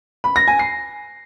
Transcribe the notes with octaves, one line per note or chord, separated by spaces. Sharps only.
B5
A#6
G#5
C7